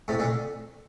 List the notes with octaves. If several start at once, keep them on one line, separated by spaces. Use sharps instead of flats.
A2 C3
A#2 D3